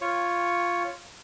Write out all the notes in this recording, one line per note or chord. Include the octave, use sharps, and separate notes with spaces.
F4 C#5